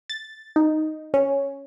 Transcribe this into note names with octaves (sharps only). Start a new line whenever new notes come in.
A6
D#4
C#4